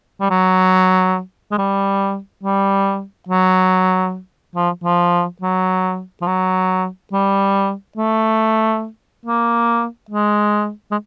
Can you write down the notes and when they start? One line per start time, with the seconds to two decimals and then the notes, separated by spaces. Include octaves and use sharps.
0.21 G3
0.30 F#3
1.51 G#3
1.58 G3
2.43 G3
3.28 F#3
4.56 F3
4.84 F3
5.42 F#3
6.22 F3
6.27 F#3
7.12 G3
7.97 A3
9.25 A#3
10.10 G#3
10.91 G#3